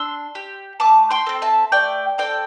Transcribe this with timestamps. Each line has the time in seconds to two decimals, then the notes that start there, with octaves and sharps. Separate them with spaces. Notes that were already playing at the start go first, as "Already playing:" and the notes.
Already playing: D4 C6 E6
0.35 G4
0.80 A3 A5 D6
1.11 G5 C6
1.27 C4 A4
1.42 E5 A5
1.72 A3 D5 G5
2.18 C4 A4 D5 G5